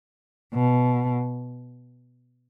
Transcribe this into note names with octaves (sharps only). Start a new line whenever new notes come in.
B2